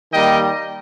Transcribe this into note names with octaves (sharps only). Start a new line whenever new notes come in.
D#3 G3 A#3 D#5 G5